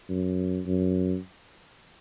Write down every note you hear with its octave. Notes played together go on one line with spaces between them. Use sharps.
F#2
F#2